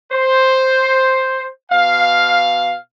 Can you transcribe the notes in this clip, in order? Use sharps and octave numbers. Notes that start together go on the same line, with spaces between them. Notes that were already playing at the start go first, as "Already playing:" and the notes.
C5
B2 F5